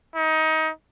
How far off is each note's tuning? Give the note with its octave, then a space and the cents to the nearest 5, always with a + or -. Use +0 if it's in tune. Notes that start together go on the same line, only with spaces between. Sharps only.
D#4 +25